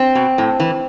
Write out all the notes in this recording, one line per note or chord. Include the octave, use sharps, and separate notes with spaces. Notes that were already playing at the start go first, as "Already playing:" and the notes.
Already playing: C4
B2
A2
E3